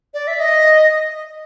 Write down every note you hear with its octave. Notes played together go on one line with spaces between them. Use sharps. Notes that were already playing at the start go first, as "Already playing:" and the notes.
D5
E5
D#5